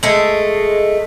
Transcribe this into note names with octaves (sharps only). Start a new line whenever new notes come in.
G#3 A3